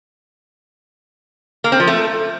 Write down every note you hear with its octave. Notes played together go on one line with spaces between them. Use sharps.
A#3
C4
F3
A3